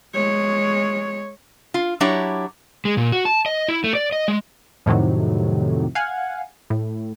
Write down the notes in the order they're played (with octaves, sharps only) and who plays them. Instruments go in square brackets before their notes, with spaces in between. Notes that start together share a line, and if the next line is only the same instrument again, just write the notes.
[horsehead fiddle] G#3 C#5
[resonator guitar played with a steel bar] F4
F#3 D4 E4 G4 C#5
[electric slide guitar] G#3
A#2
F#4
A5
D#5
E4
A3
D5
D#5
G#3
[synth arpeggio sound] F2 A2 C3 D#3 F#3
F5 F#5 G#5
A2